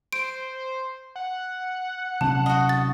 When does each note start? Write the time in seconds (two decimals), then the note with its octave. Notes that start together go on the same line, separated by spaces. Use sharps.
0.13 C5 D7
1.16 F#5
2.21 C3 F#3 C#4 A5
2.46 F#4 D#5
2.69 A6